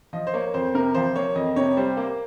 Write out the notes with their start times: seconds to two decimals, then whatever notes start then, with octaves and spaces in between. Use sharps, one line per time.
0.13 F3 D#5
0.27 C5
0.33 A#3 C#5
0.54 F2 C5
0.74 C3 A#4
0.94 F3 C5
1.16 A#3 C#5
1.36 F2 D#5
1.56 C3 C#5
1.77 G3 C5
1.97 A#3